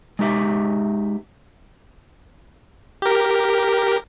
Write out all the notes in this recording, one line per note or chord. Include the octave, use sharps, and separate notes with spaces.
G#3 D#4 G4 E5
G4 A#4